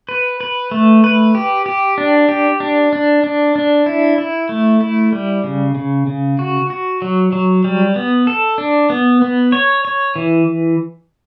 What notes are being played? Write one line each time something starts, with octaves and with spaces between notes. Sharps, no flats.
B4
B4
A3
B4
G4
G4
D4
G4
D4
D4
D4
D4
E4
E4
A3
E4
G3
C#3
C#3
C#3
F#4
F#4
F#3
F#3
G3
B3
A4
D4
B3
B3
C#5
C#5
E3